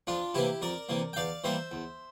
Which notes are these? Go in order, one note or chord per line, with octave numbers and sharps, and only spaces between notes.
F2 D4 F4
C3 E3 A#3 E4 G4
F2 A#4 D5
C3 E3 A#3
G5
E2 D5 F5
E3 G3 A#3 C5 E5
E2